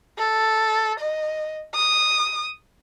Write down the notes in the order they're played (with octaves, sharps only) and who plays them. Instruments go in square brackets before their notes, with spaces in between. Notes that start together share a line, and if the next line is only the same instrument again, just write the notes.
[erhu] A4
D#5
D#6